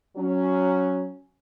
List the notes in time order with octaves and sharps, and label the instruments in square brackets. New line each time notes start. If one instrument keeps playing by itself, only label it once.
[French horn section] F#3 C#4